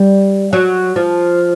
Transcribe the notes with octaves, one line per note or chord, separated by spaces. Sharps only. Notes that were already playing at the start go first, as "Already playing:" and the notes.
Already playing: G3
F#3
F3